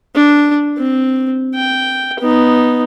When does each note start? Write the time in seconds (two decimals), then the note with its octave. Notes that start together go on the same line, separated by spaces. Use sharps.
0.15 D4
0.78 C4
1.55 G5
2.20 B3 D#4